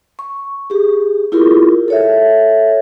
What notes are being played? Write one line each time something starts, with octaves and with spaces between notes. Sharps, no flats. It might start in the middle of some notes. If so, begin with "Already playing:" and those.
C#6
G4 G#4
E4 F4 G4 G#4 A#4
A4 C#5 E5